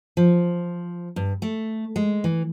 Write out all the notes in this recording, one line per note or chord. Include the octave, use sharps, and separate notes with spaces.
F3
G2
A3
G#3
E3